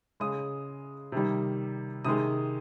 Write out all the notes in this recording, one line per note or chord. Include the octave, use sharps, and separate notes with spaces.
C#3 G#3 D#6
C3 D#3 G3
C3 D#3 G#3 D#6